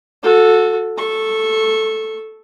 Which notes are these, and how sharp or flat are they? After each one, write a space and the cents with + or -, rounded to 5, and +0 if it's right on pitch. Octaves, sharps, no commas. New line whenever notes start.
F#4 -25 A4 +0
A4 +0 C#6 -20